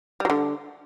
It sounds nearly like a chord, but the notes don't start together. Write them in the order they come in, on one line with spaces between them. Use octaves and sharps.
G3 F#3 D3